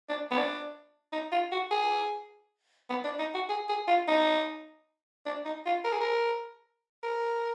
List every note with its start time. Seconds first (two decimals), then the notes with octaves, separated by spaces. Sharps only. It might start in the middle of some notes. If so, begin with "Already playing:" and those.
0.09 D4
0.31 B3
0.37 D4
1.12 D#4
1.32 F4
1.52 F#4
1.71 G#4
2.89 B3
3.04 D4
3.19 D#4
3.34 F#4
3.49 G#4
3.69 G#4
3.88 F4
4.08 D#4
5.26 D4
5.45 D#4
5.65 F4
5.84 A#4
5.93 G#4
6.00 A#4
7.03 A#4